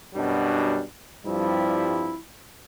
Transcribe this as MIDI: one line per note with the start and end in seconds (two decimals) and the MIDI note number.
0.15 0.81 42
0.15 0.81 47
0.15 0.81 54
0.15 0.81 55
0.15 0.81 62
1.25 2.17 43
1.25 2.17 53
1.25 2.17 55
1.25 2.17 60
1.25 2.17 64